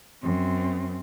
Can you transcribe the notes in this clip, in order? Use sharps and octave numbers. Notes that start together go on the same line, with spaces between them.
F#2 C4